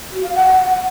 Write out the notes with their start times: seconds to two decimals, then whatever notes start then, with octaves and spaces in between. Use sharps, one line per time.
0.11 F#4
0.23 F5
0.34 F#5